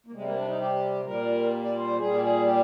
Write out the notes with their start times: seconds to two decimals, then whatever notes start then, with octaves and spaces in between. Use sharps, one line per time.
0.06 A#3
0.12 C3 G3 G#3
0.24 A#3
0.35 D4
0.47 D#4
0.59 G4
1.05 A#2 G3 A#4
1.64 D5
1.76 C5
1.98 A#2 G3 G#4
2.13 G4
2.21 G#4
2.44 G4